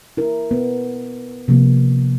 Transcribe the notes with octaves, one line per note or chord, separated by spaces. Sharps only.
E4 A#4
B3
C3 F3 A#3